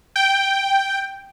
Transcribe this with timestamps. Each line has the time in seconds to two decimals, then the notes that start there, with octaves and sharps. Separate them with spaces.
0.16 G5